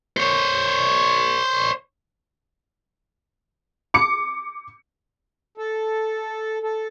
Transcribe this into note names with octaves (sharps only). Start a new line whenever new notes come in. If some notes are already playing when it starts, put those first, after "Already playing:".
C5 C#5
D6 C#7
A4
A4